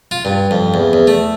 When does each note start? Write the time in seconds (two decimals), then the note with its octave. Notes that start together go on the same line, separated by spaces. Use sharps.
0.11 F4
0.25 G2
0.51 F2
0.74 E2
0.93 E2
1.07 A3